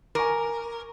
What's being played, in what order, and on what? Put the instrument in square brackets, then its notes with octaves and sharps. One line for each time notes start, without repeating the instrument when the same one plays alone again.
[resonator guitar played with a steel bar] A#4 [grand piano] G#5 C#6 D6